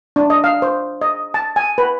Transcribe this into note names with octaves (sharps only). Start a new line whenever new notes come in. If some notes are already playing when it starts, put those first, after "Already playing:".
D4
D#5
F5
C5
D#5
A5
G#5
B4